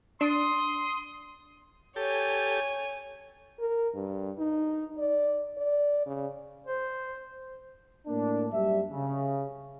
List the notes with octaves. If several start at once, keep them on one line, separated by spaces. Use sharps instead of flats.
D4 C6 D#6
G4 A4 C#5 G#5
A#4
G2
D#4
D5
D5
C#3
C5
A2 A#3 D4
F#2 G3 E5
C#3